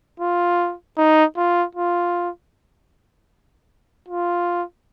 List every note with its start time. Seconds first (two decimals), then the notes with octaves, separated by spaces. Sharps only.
0.20 F4
0.97 D#4
1.37 F4
1.75 F4
4.09 F4